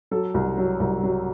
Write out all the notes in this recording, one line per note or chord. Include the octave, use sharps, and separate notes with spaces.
F#3 A4
C2
F#3
C2
F#3